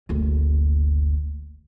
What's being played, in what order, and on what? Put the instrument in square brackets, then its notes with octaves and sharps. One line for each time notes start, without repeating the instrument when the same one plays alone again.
[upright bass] F#1 D2